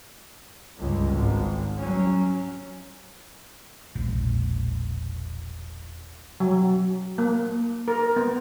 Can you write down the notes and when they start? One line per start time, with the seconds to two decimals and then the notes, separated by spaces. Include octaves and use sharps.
0.78 G1 C#2
1.11 G#1
1.76 F#3 C#4
3.95 E1 A#1
6.40 F#3
7.18 A#3
7.88 A#4
8.16 B3